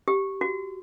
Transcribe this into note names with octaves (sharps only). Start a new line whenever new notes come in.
G4
F#4